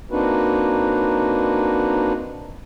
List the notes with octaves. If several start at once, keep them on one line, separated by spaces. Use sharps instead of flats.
A#3 C4 D4 D#4 F#4 B4